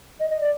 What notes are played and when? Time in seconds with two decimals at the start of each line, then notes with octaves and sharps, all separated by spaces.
0.20 D#5
0.30 D#5
0.40 D5